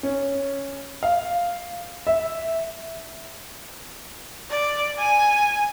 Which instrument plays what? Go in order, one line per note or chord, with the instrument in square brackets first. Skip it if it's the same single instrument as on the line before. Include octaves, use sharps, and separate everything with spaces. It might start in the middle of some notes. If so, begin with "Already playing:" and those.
[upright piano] C#4
F5
E5
[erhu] D5
G#5